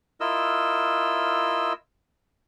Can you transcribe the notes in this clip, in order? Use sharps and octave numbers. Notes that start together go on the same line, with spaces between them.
E4 F4 A#4 D#5 E6